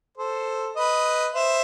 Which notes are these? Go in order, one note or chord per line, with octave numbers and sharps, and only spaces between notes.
A4 C5
B4 D#5
C5 E5